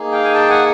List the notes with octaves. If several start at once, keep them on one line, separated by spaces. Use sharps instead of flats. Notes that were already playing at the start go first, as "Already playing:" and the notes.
Already playing: A#3 D#4 G#4
F5 G5
G#5
G5 A5
F#5 G#5